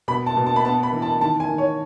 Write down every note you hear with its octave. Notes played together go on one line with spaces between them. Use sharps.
B2 B5
A5
B2
A5
B5
B3 A5
B5
E3
A5
D#3 A5
G#5
D#3
C#5